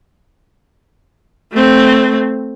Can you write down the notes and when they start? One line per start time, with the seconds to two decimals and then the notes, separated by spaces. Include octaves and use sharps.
1.52 A3 C4